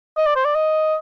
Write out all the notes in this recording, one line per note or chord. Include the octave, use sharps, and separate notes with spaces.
D#5
D5
C5
D5
D#5